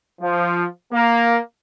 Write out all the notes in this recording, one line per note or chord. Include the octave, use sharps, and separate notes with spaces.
F3
A#3